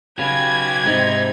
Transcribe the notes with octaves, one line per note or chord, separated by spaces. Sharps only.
C#3 F#3 G4 B4 B5 G#6
G#2 C3 D#4